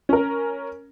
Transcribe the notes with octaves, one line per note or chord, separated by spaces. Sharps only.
C#4 A#4